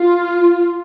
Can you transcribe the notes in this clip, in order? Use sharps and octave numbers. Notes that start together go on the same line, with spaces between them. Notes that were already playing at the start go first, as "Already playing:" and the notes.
Already playing: F4